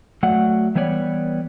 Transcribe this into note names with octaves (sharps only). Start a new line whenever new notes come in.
F#3 A3 D5 F#5
E3 G3 B3 C#5 D5